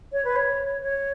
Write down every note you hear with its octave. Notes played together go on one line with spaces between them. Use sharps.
C#5
B4
C#5
C#5